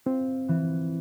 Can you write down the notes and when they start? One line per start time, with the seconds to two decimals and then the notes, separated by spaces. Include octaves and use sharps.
0.06 C4 F4
0.49 E3